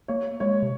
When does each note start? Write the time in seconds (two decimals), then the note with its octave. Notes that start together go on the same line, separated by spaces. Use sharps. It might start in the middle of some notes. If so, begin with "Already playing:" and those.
0.08 A#3 C#5
0.40 G#3 C#5
0.63 C3